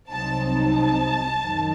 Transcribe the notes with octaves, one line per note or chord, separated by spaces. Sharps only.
C2 C3 F#3 C4 D#4 A5
A5
F#2 D#3 F#3